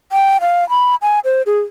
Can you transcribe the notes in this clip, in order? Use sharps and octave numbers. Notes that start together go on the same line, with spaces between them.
G5
F5
B5
G#5
C5
G#4